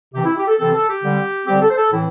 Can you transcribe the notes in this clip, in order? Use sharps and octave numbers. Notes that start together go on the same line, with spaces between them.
C3 E3 C4 G4
E4
G4
A4
C3 E3 C4 A4
A4
G4
D3 G3 C4
D3 G3 C4 G4
A4
C5
A4
A2 E3 C4 E4